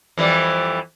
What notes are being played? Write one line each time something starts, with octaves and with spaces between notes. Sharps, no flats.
F2 E3 G3